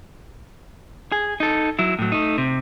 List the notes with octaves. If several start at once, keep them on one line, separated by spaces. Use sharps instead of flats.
G#4
D#4 A4
F#3 E4
A2 F#3
A3 D#4
C3